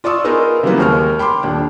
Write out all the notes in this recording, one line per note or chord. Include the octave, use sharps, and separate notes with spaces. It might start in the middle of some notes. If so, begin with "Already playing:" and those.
F4 D5 C#6 D#6 E6
B3 D#4 F4 G#4 A#4
C#3 E3 F#3 G3 A#3 B3
D#2 G#3 A#4 C#6 F6
G5 B5 C6 D6
D#1 D4